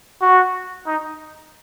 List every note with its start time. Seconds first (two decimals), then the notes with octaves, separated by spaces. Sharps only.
0.21 F#4
0.86 D#4